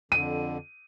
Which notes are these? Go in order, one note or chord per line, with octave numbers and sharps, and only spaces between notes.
F2 D3 D#7